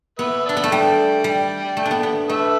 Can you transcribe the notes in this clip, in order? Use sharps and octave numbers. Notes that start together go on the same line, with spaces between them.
B3 B4 E5
D4 A4 D5
B3
A3
G3 D5 G5
G3
A3
D4
B3
B3
A3 B4 E5